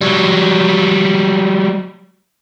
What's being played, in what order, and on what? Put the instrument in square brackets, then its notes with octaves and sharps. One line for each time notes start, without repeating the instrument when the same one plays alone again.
[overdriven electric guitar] F#3 G3